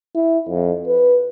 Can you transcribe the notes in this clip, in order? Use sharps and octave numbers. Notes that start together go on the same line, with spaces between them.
E4
F2
B4